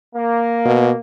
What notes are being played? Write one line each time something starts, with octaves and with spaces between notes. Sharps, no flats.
A#3
B2